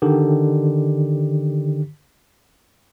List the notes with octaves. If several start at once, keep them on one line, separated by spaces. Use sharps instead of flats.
D3 D#3 G4